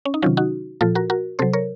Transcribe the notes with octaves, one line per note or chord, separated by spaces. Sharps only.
C#4
D#4
C3 D#3 F#3 C#4 F4
D#4 F#4
A#2 F3 F4 A4
F#4 A#4
F#4 A#4
C3 F#3 A4 C5
A#4 C#5